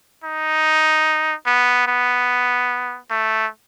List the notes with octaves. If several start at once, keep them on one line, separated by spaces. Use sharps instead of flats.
D#4
B3
B3
A3